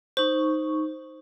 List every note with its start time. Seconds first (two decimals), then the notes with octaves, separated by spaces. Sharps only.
0.17 D#4 C5 C#6